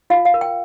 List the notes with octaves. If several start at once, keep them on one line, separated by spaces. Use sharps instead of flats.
F4 F5
F5
A#4
G5